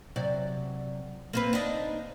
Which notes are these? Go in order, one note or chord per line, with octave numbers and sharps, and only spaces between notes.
C3 F#3 D5
A#3 C4 B4
D4 D#4